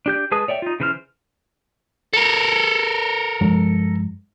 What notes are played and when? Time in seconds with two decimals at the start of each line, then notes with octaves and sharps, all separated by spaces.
0.06 D4 G4 G6
0.32 G#3 G#4 B4 A5 D#6
0.48 C#5 D5 E5 G5
0.62 D#4 F4
0.80 C#3 E3 B4 C5 F6
2.13 A4 A#4
3.41 G2 F3 G#3